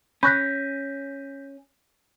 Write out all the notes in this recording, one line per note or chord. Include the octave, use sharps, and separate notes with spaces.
C#4 B5 C#6 F#6 G6 A#6 B6